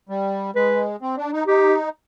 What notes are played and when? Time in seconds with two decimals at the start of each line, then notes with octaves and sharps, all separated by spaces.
0.09 G3
0.55 G#3 B4
1.02 C4
1.17 D4
1.33 D#4
1.47 D#4 G4